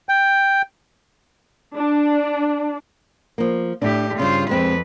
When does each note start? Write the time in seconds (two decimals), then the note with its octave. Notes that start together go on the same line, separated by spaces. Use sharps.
0.09 G5
1.77 D4
3.38 F3 A#3
3.82 A2 D4 G4
4.19 G2 C#3 F4 C5
4.49 F2 G#3 C4 B4